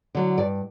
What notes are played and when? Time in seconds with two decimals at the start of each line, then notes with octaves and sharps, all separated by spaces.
0.15 D3 F#3
0.37 G2 D5